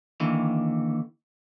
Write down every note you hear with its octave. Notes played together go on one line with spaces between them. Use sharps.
D#2 D3 E3